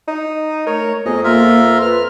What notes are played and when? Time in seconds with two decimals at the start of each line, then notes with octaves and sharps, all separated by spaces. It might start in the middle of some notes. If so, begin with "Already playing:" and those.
0.08 D#4
0.67 A3 A#4 C#5
1.06 F2 B3 G#4 D#5
1.24 A#3 F4 A#4 E5
1.81 B4 F6